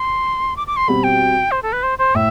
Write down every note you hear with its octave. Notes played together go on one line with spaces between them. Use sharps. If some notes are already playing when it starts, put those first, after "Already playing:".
Already playing: C6
D6
D6
C6
B2 G3 C4 F#4 B5
G5
C5
A4
B4
C5
C5
A2 E5